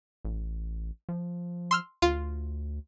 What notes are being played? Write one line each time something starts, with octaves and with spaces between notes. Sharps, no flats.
A1
F3
C6 E6 F6
D2 F4